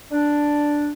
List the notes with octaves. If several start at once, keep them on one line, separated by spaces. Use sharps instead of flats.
D4